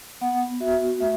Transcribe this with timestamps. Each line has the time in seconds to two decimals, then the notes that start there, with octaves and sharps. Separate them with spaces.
0.21 B3 F#5
0.60 F#4 E5
1.00 A3 E5